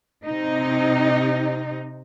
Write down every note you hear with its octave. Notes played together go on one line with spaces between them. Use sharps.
C3 D#4